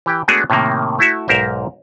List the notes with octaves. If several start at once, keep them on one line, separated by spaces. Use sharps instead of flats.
E3 G4 G5
G#3 A3 B3 D4 F#4 G#4
A2 C3 D#3 A#3
A3 E4 F#4 E5
B1 G#2 A#4 C5 E5